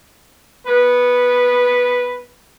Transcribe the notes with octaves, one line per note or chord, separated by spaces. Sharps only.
B3 B4